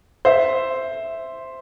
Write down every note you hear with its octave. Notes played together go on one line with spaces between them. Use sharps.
C5 E5